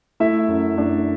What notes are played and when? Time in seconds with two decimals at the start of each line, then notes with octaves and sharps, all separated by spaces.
0.20 A3 E4 E5
0.48 F#2
0.78 A3 D4 D5